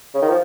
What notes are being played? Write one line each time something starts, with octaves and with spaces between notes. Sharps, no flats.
C#3
D#3
F3